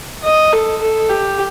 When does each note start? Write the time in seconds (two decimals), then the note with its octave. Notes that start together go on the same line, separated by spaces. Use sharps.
0.24 D#5
0.53 A4
0.82 A4
1.10 G4